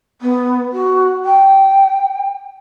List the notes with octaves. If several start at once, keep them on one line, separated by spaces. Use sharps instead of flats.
B3
F#4
G5